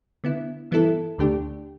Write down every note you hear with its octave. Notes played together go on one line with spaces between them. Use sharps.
D3 B3 E4
G2 E3 B3 E4 A4
D2 D3 A3 D4 G4